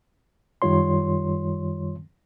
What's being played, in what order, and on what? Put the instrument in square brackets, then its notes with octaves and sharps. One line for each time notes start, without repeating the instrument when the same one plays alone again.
[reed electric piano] F#2 D#3 G3 F4 C#5 C6